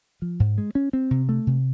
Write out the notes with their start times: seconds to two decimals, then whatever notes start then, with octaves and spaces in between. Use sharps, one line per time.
0.22 F3
0.40 G#2
0.58 G#3
0.75 C#4
0.93 C4
1.11 C3
1.29 A3
1.47 C3